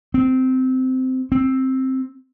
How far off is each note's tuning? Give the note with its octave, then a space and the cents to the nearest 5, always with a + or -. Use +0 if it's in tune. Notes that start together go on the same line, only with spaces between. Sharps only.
C4 -15
C4 +5